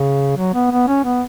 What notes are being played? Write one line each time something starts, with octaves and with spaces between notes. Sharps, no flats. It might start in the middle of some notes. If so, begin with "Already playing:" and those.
Already playing: C#3
F#3
B3
B3
C#4
B3